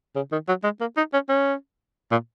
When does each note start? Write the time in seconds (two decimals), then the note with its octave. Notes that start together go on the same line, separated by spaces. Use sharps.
0.16 C#3
0.32 D#3
0.48 F#3
0.64 G#3
0.81 A#3
0.97 D#4
1.13 C#4
1.29 C#4
2.11 A#2